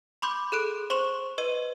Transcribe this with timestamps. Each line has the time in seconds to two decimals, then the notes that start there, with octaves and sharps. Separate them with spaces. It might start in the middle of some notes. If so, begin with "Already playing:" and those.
0.22 B5 C6 D6 G6
0.52 G#4 A4 F#6 D7
0.90 C5 C6 C#6 E7 F7
1.38 B4 D#5 D#7